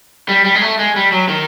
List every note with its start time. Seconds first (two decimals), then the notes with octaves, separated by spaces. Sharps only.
0.29 G3
0.45 G3
0.55 G#3
0.61 A3
0.79 G#3
0.96 G3
1.12 F#3
1.29 D#3